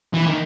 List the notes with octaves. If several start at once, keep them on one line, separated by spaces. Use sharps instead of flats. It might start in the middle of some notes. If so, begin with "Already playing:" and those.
E3
D#3